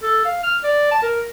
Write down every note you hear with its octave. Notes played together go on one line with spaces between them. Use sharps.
A4
F5
F6
D5
A5
A#4